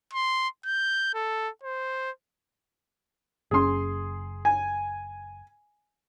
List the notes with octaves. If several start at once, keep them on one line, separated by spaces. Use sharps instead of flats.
C6
G6
A4
C5
F#1 B2 C#4 G#4 C6
G#5